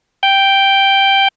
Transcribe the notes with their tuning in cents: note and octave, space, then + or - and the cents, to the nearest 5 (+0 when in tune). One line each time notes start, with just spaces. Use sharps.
G5 +0